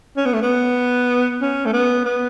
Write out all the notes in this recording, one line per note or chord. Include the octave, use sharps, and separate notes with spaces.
C#4
B3
A3
B3
C#4
A3
B3
B3